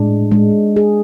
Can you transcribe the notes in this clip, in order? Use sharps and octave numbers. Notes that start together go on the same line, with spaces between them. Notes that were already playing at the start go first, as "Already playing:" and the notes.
Already playing: A2 G#3 D4
G#3
G#4